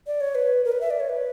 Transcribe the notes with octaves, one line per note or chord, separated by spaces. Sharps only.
D5
C#5
B4
A#4
B4
E5
D5
C#5
B4